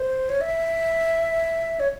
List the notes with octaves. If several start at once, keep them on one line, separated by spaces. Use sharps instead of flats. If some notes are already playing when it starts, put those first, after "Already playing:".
Already playing: C5
C#5
E5
C#5